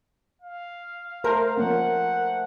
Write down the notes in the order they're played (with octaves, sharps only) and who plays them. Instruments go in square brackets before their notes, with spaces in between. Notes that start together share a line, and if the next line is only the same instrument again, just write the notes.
[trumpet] F5
[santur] A3 C5 [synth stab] A#4
[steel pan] F3 A#3 C#4 [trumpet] F#5